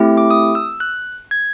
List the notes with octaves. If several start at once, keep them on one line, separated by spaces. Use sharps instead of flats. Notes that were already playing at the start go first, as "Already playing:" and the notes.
Already playing: A3 C4 E4 G4
D6
D#6
E6
F#6
G#6